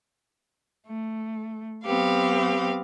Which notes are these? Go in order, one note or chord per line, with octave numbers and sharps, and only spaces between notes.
A3
F#3 B3 C4 G4 F5